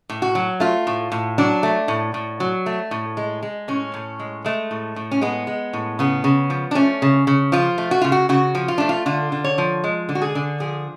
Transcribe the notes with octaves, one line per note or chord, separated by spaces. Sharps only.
A2
F#4
F#3
A3 F4
A2
A2
F#3 D4
A3
A2
A2
F#3
A3
A2
G#3
G#3
A2 C#4
A2
G#3
G#3 A3
A2
A2
C#4
G#3 B3
G#3
A2
C#3 B3
C#3
F3
D4
A3 C#4
C#3
C#3
F3 F4
A3
F#4
C#3 F4
F#4
C#3 F#4
F3
F4
A3 D4
F4
D3 F4
D3
C#5
F3
G#3
D3
F#4
G#4
D3
F3 G#4